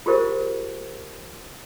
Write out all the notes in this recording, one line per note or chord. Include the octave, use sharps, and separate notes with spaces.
F4 G4 G#4 A#4 C5 E5